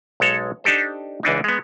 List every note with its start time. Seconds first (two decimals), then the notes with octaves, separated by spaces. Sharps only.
0.20 B1 G#3 A4 C#5
0.64 D4 D#4 G4 A4 C5
1.23 C#2 E3 D4 D#4
1.44 G#3 B3